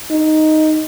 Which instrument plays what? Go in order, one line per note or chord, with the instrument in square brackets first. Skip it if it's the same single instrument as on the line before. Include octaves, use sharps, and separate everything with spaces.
[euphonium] D#4